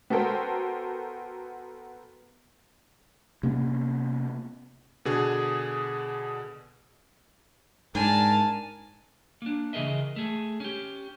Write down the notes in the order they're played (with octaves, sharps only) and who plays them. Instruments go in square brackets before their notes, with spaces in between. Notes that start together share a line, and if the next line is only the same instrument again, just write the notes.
[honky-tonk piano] B3 F#4 A4 A#4 C5 G5
[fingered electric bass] C3 A#3 B3 C#4
[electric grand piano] B2 D3 G#4
[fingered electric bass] G#2 [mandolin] D4 [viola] A#4 A5 [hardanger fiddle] G#5
[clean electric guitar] A#3 D4
C#3 E3 G#4 A#4 D#5 E5
A3 G#4
C#4 G4